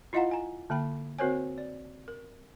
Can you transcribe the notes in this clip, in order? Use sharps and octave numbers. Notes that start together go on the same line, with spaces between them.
E4 F4 D#5 F5 F#5 A#5
G#5 A#5
D3 A#3 G5 B5
C4 F#4 A#4 C5 C#5 G#5
D5
A#4